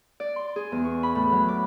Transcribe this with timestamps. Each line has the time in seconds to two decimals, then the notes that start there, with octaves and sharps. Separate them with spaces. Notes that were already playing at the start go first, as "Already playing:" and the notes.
0.20 D5
0.36 C6
0.56 G#4
0.72 E2
0.84 C#6
1.03 B5
1.15 A2
1.32 F#3
1.48 D6